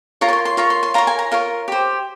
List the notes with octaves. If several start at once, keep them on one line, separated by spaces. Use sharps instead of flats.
F4 A#4 C#5 A#5
C#6
C6
C6
F4 A#4 C#5 C#6
C6
C6
F4 A#4 C#5 A#5
G#5
A#5
F4 A#4 C#5
G4 C5